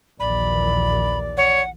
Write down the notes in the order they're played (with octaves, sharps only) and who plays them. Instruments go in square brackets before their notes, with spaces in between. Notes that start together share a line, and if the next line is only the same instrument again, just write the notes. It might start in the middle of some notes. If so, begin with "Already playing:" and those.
[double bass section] A#1 D#2 E3 [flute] D5 [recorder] B5
[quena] C#5 [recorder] F#5